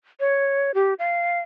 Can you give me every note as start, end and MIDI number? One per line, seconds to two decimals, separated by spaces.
0.20 0.72 73
0.74 0.94 67
0.99 1.40 77